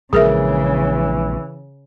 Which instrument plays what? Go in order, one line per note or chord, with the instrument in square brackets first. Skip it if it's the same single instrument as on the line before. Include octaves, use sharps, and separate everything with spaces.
[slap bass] A#1 G#3 [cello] C#3 [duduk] E3 [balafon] G#4 A#4 E5